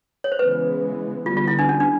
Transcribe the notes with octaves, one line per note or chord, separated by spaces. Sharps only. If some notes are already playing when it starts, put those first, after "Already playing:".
C#5
C5
C#3 E3 G#3 B3 B4
D3 G3 B3 F4
F4
E4
D4
C#4
D4